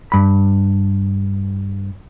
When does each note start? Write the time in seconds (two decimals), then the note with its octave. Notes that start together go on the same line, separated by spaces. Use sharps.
0.12 G2 B5